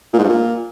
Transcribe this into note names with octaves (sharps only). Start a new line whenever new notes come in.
A#2
G#2
G2
A#2